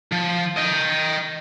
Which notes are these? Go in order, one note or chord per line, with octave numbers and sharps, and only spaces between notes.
F3
D#5 G5